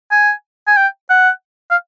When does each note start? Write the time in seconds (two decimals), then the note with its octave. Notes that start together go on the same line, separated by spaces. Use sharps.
0.11 G#5
0.67 G#5
0.77 G5
1.10 F#5
1.71 F5